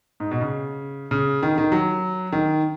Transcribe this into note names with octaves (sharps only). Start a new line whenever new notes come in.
G#2
B2
C#3
C#3
D#3
D#3
F#3
D#3